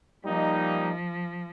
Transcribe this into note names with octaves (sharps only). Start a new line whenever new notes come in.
F3 G3 A#3 D#4